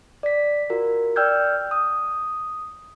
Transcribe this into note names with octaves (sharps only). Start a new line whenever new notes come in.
D5 B6
F4 F#4 A#4
D5 G5 E6 F6 G6 G#6
D#6